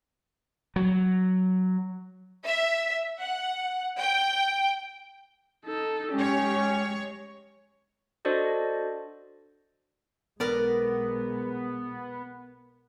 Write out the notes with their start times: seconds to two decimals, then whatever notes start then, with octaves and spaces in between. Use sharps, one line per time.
0.76 F#3
2.44 E5
3.20 F#5
4.00 G5
5.65 D#4 A4
6.12 G#3 C#4 G4 C#5
8.25 D4 F#4 A4 C5 D5 D#5
10.40 B1 G#3 B3 A#4 D5